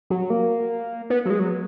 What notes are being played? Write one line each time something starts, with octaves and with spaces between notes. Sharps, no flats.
F#3
A#3
B3
F#3
G#3
F#3